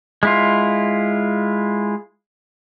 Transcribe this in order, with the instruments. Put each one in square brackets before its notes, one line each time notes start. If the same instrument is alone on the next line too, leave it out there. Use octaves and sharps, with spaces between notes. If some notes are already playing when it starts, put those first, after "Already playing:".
[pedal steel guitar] G#3 E4 F4